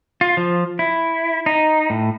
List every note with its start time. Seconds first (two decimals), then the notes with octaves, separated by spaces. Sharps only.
0.21 F4
0.37 F3
0.79 E4
1.46 D#4
1.90 A2